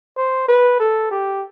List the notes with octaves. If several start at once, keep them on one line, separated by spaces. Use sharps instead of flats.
C5
B4
A4
G4